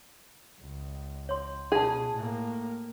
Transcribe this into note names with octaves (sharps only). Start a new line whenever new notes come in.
C#2
C#5 C6
B2 F4 G#4 A5
A2 A#3